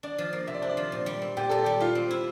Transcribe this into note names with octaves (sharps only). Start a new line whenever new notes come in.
D4 D5
F3
A#3
C3 E5
D5
D4 C5
D5
F3
A#2
G3
C4
A#2 G4
A#2 A4
G3 G4
F4 G4
C4
E4